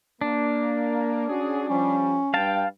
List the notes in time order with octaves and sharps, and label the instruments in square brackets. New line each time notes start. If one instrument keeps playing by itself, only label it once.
[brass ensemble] A#3 [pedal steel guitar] D4
[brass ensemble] C#4 F#4 G#4
[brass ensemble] F3 G3 [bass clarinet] C#4
[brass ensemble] G2 G5 [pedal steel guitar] F5 A5